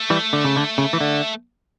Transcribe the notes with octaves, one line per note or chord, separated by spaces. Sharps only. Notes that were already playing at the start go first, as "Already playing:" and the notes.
Already playing: A3
E3 G3
D3
C#3
D3
C#3
E3
D3